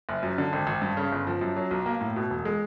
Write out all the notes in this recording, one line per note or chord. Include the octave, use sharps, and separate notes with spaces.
F#1
F#2
D3
G#1
G#1
G2
C#3
G1
F3
F#2
F#3
B1
A#3
A2
B2
E1
G#3